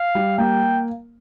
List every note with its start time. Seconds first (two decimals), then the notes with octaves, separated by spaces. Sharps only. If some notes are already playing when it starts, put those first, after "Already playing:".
Already playing: F5
0.15 G3
0.38 A#3 G5